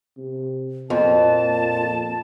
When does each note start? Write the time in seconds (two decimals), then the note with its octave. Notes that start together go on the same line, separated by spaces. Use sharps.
0.17 C3
0.90 F2 A#2 A5